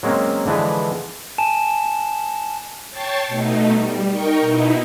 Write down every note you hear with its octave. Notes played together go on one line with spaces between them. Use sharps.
F#3 G#3 A#3 C4 C#4
D3 E3 F3 G#3 B4
G#5 A5 E7
C#5 G5 A5 C#6 A6 C7
B2 A3 D#4
G3
D#4 A#4 G5 C#6
B2 D#4 E4